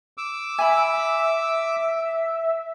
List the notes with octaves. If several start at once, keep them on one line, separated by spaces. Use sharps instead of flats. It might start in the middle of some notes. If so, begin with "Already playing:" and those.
D6 E6
E5 G#5 B5